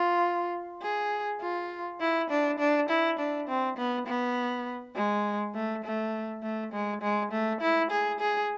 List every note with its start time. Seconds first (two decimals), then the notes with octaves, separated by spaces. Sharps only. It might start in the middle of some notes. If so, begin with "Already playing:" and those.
Already playing: F4
0.82 G#4
1.41 F4
2.00 E4
2.30 D4
2.59 D4
2.89 E4
3.19 D4
3.48 C4
3.77 B3
4.07 B3
4.96 G#3
5.55 A3
5.85 A3
6.43 A3
6.73 G#3
7.02 G#3
7.32 A3
7.61 E4
7.91 G#4
8.20 G#4